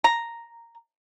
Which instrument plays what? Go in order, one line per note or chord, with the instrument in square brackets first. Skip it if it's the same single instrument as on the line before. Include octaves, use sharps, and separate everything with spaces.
[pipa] A#5